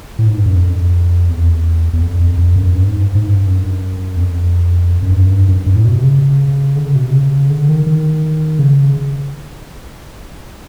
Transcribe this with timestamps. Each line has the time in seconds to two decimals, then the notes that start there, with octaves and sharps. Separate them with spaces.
0.19 A2
0.27 G#2
0.37 G2
0.46 F#2
0.55 F2
1.28 E2
1.93 E2
2.01 F2
2.20 F2
2.38 F2
2.56 F#2
2.75 G2
2.87 G#2
3.00 G2
3.15 G#2
3.27 G2
3.48 F#2
4.17 E2
4.21 F2
5.02 F#2
5.12 G2
5.22 F#2
5.30 G2
5.48 F#2
5.66 G2
5.76 A2
5.85 B2
5.95 C3
6.04 C#3
6.76 D3
6.85 C#3
6.95 B2
7.05 C3
7.13 C#3
7.50 D3
7.68 D#3
7.86 D#3
8.59 C#3